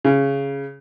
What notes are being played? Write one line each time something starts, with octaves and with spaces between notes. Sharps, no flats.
C#3